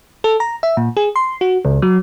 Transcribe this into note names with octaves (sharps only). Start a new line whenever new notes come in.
A4
A#5
E5
A#2
G#4
C6
F#4
C#2
F#3